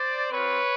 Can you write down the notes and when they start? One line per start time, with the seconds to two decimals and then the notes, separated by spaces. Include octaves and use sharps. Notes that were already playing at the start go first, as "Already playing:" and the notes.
Already playing: C5 D5
0.30 C4 F4 B4 C#5